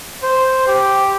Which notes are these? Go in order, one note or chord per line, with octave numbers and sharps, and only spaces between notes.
C5
G4